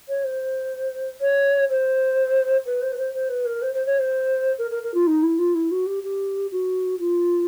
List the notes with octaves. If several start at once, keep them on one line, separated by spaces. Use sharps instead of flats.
C#5
C5
C#5
C5
B4
C5
B4
C5
C5
B4
A#4
C5
C5
C#5
C5
A#4
A#4
A#4
F4
D#4
E4
F4
E4
F#4
G4
G4
F#4
F4